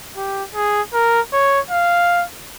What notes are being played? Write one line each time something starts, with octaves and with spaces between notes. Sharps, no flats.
G4
G#4
A#4
C#5
F5